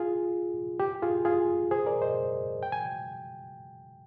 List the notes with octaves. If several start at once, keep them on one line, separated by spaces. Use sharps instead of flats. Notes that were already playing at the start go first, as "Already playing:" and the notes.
Already playing: F4 G#4
G4
F4 G#4
F4 G#4
G#4 C5
A#4 D5
C5 D#5
G5
G#5